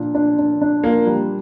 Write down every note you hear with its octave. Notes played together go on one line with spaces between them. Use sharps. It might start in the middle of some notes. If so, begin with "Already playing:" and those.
Already playing: A#2 D4 F4
D4
D4
D4
A#3 F4
G3